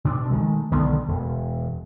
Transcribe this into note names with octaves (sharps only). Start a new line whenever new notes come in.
B2 D4
D#3 F3 G#3 A3
B1 D3 D#3 B3
E1